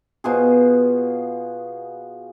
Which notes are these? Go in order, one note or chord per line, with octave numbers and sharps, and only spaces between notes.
B2 F4 G#4